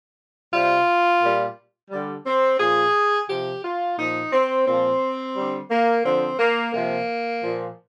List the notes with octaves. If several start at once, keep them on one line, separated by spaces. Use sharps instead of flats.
C3 G3 F4
A#2 G3
D3 G3
C4
A#2 F3 G#4
C3 F3 G4
F4
A#2 F3 D#4
C4
A#2 F3 C4
D3 G3
A#3
D3 F3 C4
A#3
C3 F3 A#3
A#2 F3